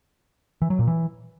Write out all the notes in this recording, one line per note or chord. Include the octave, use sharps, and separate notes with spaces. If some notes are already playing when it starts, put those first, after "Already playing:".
E3
F#3
A#2
E3